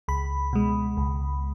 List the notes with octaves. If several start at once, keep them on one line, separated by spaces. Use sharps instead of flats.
C#2 B5
B2 G#3
C#2